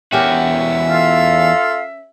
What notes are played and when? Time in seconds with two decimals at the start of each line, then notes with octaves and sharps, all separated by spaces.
0.12 E2 C#4 F#4 G4 A#4 E5
0.89 F4 A4 F5